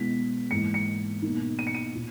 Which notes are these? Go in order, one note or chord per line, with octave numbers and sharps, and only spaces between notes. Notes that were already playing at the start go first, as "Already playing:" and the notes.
Already playing: B2 G#3 B3 E4 B6
G#2 E3 A#3 C#7
C#7
B2 A#3 D#4
D#7
C#7
D#7
A#2